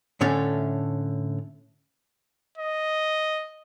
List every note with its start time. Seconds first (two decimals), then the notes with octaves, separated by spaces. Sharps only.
0.21 A2 D3 A3 C#4
2.58 D#5